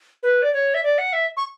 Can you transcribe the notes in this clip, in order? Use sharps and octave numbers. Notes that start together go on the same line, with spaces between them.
B4
D5
C#5
E5
D5
F#5
E5
C#6